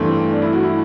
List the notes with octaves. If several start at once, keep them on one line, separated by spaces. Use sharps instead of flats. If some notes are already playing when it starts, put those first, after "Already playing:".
Already playing: G2 E3 A3 C4
D4
E4
F#4
E4